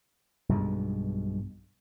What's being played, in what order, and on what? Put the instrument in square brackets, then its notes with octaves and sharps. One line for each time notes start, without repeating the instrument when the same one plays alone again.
[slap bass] B1 G2 B2 G#3